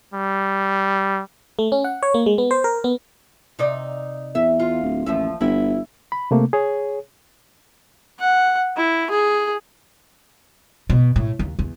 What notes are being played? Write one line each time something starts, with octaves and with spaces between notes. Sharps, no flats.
G3
A3
C#4
F#5
C#5
A#3
G#3
B3
C5
A#4
B3
C3 D#4 D5
E2 E5
F4
D1
A1 D#2 F3 E5
G1 E4
B5
C3 A3 A#3
G#4 C#5
F#5
E4
G#4
B2
A2
D#2
E2